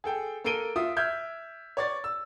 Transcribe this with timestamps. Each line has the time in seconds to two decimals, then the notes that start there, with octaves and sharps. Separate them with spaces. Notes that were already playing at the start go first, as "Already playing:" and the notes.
0.04 G#4 A4 G5
0.44 A#3 A4 A#4 D7 D#7 G7
0.76 F4 E5 D#6
0.97 E5 F6 G6 G#6
1.77 C#5 D5 A6
2.04 E6